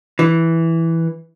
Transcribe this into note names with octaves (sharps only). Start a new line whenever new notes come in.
E3